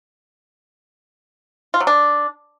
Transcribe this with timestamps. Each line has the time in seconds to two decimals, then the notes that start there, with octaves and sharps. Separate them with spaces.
1.74 F4
1.80 F#3
1.87 D4